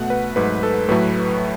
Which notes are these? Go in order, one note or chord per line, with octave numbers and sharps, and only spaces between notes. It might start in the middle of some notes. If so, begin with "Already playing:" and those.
Already playing: B2 A3 F#5
B4
G#2 F#3 A3 B4
A4
A2 F#3 A3 B4